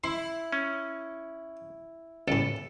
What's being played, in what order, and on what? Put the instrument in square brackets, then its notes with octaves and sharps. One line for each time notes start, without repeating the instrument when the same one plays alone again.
[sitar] E4 [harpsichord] C6
[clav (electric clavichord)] C#4
[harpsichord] C#2 A2 [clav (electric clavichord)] A4